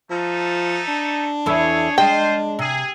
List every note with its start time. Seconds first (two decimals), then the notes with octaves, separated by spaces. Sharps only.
0.10 F3 A3 D#4 A4
0.88 D4
1.46 E2 E4 G#4 A4 C#5
1.98 G#3 F4 C5 D#5 G5
2.59 C3 G#4